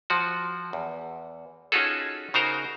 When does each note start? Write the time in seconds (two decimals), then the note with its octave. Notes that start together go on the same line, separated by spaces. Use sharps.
0.10 F3 F#4
0.73 E2
1.72 C#4 D#4 F4 F#4 G#4 A4
2.34 C#3 D#4 F#4 A#4 C5 A#5